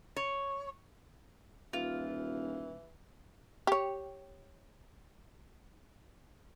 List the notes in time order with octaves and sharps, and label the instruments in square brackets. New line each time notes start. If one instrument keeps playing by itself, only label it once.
[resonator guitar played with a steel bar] C#5
[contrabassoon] D#1 [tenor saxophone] E3 [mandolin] F4
[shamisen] G4 C#5